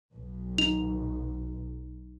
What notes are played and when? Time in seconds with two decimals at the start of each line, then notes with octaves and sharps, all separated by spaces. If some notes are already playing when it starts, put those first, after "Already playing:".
0.14 B1
0.58 D#4 F7